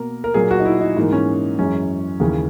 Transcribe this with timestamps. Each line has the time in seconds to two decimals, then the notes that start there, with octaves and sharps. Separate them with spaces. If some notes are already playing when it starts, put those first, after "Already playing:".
Already playing: B2 A#3 A#4
0.24 A#4
0.34 A#2 F#3 A#3 G#4
0.51 F#4
0.60 D#4
0.65 E4
0.81 D#4
0.97 G#2 E3 A#3 D#4
1.13 C#4
1.59 F#2 E3 G#3 C#4
2.20 D#2 C#3 E3